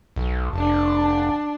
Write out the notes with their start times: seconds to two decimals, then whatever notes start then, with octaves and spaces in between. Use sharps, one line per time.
0.16 B1
0.53 F1 D4 A5